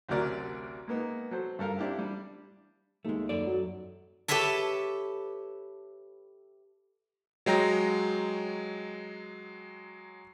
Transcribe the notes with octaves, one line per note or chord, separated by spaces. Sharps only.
A1 D2 C3 F#3 A#4 D5
G#3 A#3 B3 D#4
F#3 A4 C5
G2 A4 A#4 F5 F6
C4 D4 E4 G4 F5
G3 D4
D#2 G#3 A3
F#2 A4 D5
F#3
G4 A4 B4 C#5 E5 A5
F#3 G#3 G5 A#5 A#6